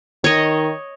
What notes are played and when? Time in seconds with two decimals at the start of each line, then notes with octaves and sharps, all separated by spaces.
0.24 D#3 C#5 D#5